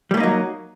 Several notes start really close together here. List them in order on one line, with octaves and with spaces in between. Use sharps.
G3 A3 A#3 D#4 F#3